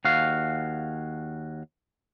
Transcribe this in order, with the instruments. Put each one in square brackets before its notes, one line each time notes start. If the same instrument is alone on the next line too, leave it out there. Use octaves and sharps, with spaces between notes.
[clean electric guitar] D#2 F#4 F5